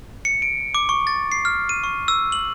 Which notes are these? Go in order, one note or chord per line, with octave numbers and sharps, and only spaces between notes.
C#7
D7
D6
C#6
A6
C7
F6
D#7
C#6
E6
F#7